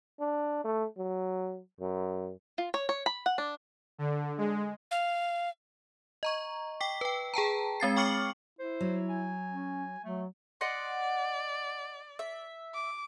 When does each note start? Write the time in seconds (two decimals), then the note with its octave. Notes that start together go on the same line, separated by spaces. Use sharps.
0.19 D4
0.64 A3
0.98 F#3
1.81 F#2
2.58 F4
2.74 C#5
2.89 C#5
3.06 B5
3.26 F#5
3.38 D4
3.98 D3
4.38 G#3
4.91 F5
6.23 D#5 A#5 C#6
6.81 G5 D6 B6
7.01 B4 G5
7.34 G#4 G5 A5 A#5
7.80 G#3 C4 A6 C7
7.97 G5 C#6 D6 F6 C#7 F#7
8.59 E4 C5
8.81 F#3
9.09 G#5
9.52 C#4
10.04 F#3 A3
10.61 D5 D#5 F#5 C6
12.19 E5
12.74 D6